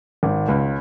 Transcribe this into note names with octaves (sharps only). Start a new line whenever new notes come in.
G#1
C#2